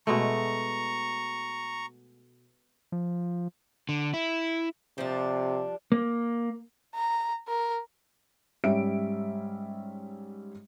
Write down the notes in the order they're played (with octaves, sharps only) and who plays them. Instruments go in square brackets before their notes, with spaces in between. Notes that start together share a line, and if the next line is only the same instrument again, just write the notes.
[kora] B2 G#3 A3 [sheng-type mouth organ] A#5 C#6
[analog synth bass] F3
[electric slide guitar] D3
E4
[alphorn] C3 [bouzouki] F3 G3 D4
[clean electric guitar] A#3
[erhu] A#5
A#4
[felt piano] G#2 G3 C#4 E5 D7